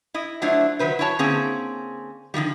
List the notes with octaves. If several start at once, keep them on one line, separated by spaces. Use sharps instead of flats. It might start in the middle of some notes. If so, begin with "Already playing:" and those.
E4 D#5
F#3 A3 D4 E4 F4 C5
D#3 F#3 B4 C5
E4 F#4 C#5 A5
D3 A#3 C4 C#4 G#4
D3 D#3 F3 G3